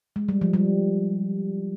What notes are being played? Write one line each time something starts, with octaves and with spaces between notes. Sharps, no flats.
G#3
G3
F3
G3